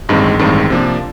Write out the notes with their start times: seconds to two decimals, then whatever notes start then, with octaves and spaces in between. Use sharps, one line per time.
0.09 A1 G2 D#3 G#3 C4
0.39 A1 G2 D#3 G#3 C4
0.70 C3 F3 A#3 D4